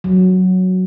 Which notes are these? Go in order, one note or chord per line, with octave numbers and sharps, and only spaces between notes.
F#3